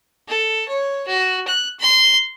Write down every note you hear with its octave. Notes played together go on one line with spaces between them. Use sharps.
A4
C#5
F#4
F#6
C6